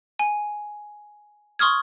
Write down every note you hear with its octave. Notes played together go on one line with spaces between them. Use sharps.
G#5
C6 C#6 D#6 F6 G#6